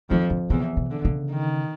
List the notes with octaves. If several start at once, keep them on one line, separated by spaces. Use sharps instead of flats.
F2 D#3 F3
D3
E2 C#3 E3
C3
D3
C#3
D#3